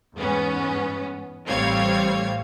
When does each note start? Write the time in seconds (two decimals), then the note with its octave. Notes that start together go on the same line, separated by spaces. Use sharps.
0.16 E2 G#2 B3 C#4
1.47 A1 G3 C4 C#5 F5 G#6